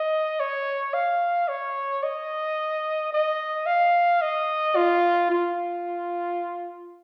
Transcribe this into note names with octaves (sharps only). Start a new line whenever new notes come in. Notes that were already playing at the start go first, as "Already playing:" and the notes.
Already playing: D#5
C#5
F5
C#5
D#5
D#5
F5
D#5
F4
F4